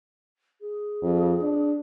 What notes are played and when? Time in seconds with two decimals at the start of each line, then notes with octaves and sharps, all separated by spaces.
0.61 G#4
1.03 F2
1.41 D4